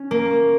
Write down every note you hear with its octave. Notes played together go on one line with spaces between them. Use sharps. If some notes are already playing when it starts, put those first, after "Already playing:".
Already playing: C#4
A#3